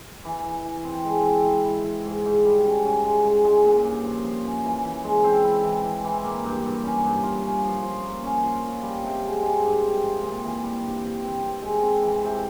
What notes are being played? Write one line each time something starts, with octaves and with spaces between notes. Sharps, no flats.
E3
E3
E3
C4
G#3
C4
E4
E4
E4
G#2
G#2
G3
C#4
C#4
G#3
G#3
G#3
A#2
G2
F3
F3
C#4
E3
E3
G#3
C4
E4
E3
E3
E3
A#3
G2
G2
C#4
G2
F4
C#4
F3
F3
A#3
C#4
F3
F4
G3
C3
G#3
G#3
G2
C4
F3
A#2
E3
G3
G2
C4
C4
C4
G#3
C4
E3
C3